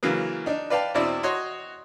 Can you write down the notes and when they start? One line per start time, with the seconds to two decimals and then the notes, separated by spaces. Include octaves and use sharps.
0.03 C#3 E3 F#3 A#3
0.46 D4 D#4
0.70 B4 D5 F5 G5 A5
0.94 E2 B2 C4 E4 D5
1.23 F#4 C#5 D#5 C6 D#6